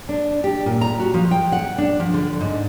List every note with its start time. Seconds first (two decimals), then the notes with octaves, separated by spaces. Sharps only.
0.09 D4
0.44 G4
0.66 A#2
0.81 A#5
1.00 F#4
1.14 F3
1.31 G5
1.52 F#5
1.78 D4
2.00 F3
2.14 D3
2.41 G#2